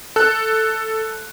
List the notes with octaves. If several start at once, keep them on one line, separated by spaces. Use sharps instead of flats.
A4 F#6